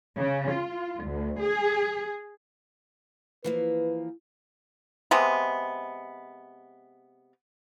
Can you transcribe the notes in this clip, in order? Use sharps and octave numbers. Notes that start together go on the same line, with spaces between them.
C#3
F4
D2
G#4
E3 F3 A#3 B4
C3 G#3 B3